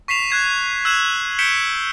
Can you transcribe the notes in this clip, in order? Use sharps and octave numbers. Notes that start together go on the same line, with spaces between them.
C#6 B6 C7 E7 F7
F#6 G#6 C7
E6 F#6 G#6 E7 F#7
G6 B6 C#7 D7 E7 G7